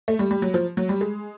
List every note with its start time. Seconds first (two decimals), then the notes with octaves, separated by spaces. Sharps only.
0.08 A3
0.19 G3
0.31 G3
0.42 F#3
0.54 F3
0.77 F#3
0.89 G3
1.01 G#3